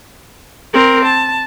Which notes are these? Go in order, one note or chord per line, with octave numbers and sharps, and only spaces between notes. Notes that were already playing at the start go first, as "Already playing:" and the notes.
C4 A#4
A5